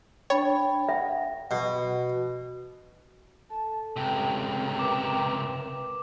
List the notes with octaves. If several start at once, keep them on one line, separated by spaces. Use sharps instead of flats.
D4 C#5 G5 B5 A6
E5 F#5
B2
A4 A5
C#2 C3 G5
A#4 B4 E5 D6